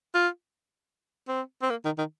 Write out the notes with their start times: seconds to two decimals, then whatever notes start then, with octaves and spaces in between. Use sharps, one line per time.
0.15 F4
1.28 C4
1.62 C4
1.70 A#3
1.85 D#3
1.98 D#3